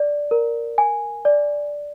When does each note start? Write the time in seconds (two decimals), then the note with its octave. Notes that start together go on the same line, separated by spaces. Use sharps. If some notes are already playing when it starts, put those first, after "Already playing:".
Already playing: D5
0.31 A#4
0.78 G#5
1.25 D5